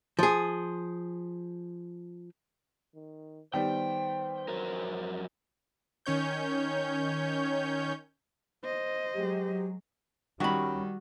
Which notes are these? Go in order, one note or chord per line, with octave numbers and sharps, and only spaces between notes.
F3 G#4
D#3
D#3 G3 B3 C5 G5
F2 F#3 A#4
D#3 C#4 C#5 G6
C5 D#5
F#3 G#3 G4
D#3 G3 C#4 F#4 B5